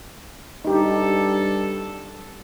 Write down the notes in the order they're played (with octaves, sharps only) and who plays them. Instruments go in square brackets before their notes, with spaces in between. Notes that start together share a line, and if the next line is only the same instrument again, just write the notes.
[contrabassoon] G2 [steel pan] D#4 G4 [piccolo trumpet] A4